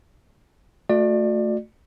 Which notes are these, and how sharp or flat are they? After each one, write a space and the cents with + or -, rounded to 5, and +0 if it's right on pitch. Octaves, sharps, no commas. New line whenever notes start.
A3 +0 F#4 -30 D5 +25